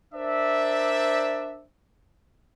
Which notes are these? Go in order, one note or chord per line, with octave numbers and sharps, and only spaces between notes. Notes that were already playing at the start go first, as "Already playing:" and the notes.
D4 A#4 C5 D5 E5